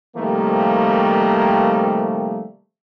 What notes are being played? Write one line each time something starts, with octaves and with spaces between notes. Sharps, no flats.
C3 D#3 F3 G3 A3 A#3